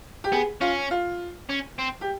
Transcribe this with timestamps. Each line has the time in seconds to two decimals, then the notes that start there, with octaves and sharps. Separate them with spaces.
0.24 G4
0.32 B3 G#4
0.61 C#4 F4
0.91 F4
1.50 C#4
1.79 C4
2.01 G4